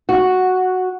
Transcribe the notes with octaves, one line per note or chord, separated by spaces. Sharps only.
F#4